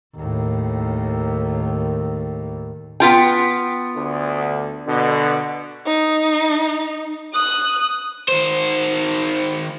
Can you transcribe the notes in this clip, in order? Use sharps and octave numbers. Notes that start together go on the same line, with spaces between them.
D#2 A2
B3 F4 G5
D2 D3
B2 D3
D#4
D#6 F#6
D#3 C5